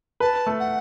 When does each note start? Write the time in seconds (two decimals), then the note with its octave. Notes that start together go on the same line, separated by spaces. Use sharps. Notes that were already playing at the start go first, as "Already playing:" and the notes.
0.20 B4 A5
0.47 A3
0.60 F#5